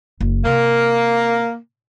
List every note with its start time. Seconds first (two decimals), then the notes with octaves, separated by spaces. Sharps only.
0.21 F#1
0.45 C3 A#3